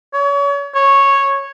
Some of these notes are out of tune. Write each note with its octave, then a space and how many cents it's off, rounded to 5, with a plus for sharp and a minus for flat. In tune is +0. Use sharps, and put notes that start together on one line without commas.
C#5 +35
C#5 -5